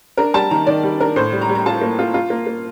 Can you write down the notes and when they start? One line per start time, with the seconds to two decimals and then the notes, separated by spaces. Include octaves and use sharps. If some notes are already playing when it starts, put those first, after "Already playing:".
0.17 D4 A#4
0.34 G3 A5
0.51 D#3 A#5
0.67 D#3 D5
0.83 G3
1.00 D4 A#4
1.16 A2 C5
1.33 G3
1.41 A#5
1.49 G3
1.55 A#5
1.66 F4 A5
1.81 A#3
1.99 F4
2.14 F4
2.30 A#3
2.47 A#3